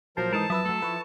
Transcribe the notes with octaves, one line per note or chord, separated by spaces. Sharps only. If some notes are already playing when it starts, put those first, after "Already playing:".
A#1 F3 F#3 A#4 C5 A5
G#2 E3 D#4 A4 A#4 A5 D#6
F#2 F3 B4 E5 D#6 E6
F#3 A3 A4
F3 E4 B4 C#6